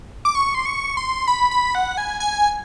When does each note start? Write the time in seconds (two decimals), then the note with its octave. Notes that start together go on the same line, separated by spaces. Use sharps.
0.25 D6
0.35 C#6
0.55 C6
0.66 C#6
0.97 C6
1.27 B5
1.51 B5
1.75 F#5
1.98 G#5
2.20 G#5